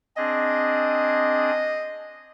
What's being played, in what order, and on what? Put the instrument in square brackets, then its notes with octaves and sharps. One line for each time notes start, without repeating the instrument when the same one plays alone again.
[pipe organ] C4 D4 G#4 [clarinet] D#5